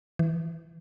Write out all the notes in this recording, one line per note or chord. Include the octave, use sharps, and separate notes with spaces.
E3